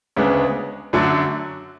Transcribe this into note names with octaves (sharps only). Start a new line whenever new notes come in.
D2 C#3 G#3 B3 D4
F#2 D3 A3 D4 F#4